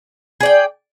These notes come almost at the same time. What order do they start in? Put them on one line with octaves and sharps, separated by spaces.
G#4 D5 G5